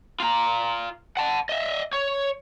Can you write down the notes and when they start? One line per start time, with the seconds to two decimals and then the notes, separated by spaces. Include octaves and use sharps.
0.20 F4 A#5
1.17 F#5 A5
1.49 D#5 E5
1.93 C#5